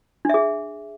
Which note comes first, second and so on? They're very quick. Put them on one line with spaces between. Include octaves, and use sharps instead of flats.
D4 E5 G#4